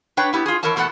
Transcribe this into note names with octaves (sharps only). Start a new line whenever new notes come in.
D4 B4 C#5 G5
B3 E4 G4
F4 G#4
E3 A#4 C#5 E5 A5
E2 B2 A3 C4 F#5 A5